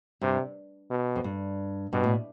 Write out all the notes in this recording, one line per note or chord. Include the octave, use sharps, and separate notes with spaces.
G2 C3
B2
F2
G2
G2 B2
A2